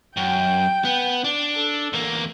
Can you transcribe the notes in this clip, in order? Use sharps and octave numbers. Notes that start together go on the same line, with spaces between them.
F#2 G5
B3
D4
A4
E2 A#3